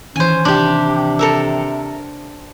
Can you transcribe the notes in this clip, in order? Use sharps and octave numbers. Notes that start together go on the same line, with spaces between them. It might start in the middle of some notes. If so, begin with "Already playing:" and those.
D#3 E3 C#4 C5 G#5
C3 D4 G4
A4 A#4 E5